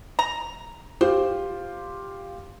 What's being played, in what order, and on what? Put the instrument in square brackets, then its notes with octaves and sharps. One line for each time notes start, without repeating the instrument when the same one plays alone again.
[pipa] A#5
[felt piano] F4 G4 [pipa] C5